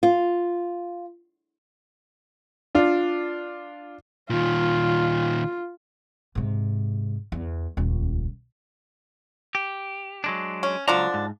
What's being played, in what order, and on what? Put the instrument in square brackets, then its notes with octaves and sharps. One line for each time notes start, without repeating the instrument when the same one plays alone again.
[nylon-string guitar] F4
[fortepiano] D4 F4
[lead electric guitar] A#2 D#3 [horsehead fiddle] F4
[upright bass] G#2 C3
E2
D#1 C#2
[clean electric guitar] G4
F#3 G#3 D4
[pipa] C#4
[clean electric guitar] C#2 F#3 A#5 [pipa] D3 F3 D4
[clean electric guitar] G#2